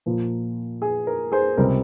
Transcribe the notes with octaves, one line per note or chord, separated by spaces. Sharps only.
A#2 F3 A#3
G#4
A#4
G#4 C5
C#2 C3 G3 C4 A#4